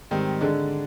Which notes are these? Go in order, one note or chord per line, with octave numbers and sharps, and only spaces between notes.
G#2 D#3 G3 C4 D#4
D3 G#3 D4